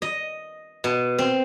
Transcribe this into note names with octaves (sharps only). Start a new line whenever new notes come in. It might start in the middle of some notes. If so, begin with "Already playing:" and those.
D#5
B2
C4